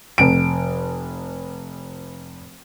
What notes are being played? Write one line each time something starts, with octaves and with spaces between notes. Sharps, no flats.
F1 D7